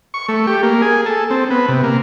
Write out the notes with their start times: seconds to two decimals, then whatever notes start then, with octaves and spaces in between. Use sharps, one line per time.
0.14 C#6
0.28 A3
0.47 G4
0.63 A#3
0.82 G#4
1.06 A4
1.30 C4
1.50 B3
1.68 C3
1.84 A#3